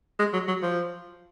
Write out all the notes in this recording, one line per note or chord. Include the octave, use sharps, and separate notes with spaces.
G#3
F#3
F#3
F3